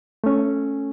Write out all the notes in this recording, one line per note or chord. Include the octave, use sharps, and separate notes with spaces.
A3 C#4